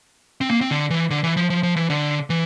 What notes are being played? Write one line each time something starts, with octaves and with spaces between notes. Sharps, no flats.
C4
A#3
C4
D3
E3
D3
E3
F3
F3
F3
E3
D3
E3